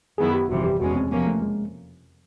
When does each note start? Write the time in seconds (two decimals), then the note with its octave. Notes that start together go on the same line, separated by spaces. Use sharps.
0.18 F#2 D#3 F#3 B3 E4 G#4
0.34 G4
0.49 G1 F2 C3 E3 G3 F#4
0.64 G4
0.80 E2 B2 G#3 C#4 F#4
0.96 C4
1.11 F2 C3 F3 A#3 B3 C#4
1.27 A3
1.42 G#3